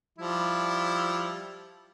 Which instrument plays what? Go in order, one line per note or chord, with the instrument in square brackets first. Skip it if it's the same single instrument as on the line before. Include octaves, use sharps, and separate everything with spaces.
[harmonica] F3 G3 E4